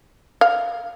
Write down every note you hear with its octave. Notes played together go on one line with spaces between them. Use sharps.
F5